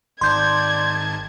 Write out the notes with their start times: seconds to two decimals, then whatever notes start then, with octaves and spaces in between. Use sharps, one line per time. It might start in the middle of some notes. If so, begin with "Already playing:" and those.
0.21 G#1 D#3 D5 A5 C6 G6 G#6